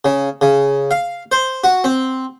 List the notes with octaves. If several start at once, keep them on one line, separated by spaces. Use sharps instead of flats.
C#3
C#3
F5
C5
F#4
C4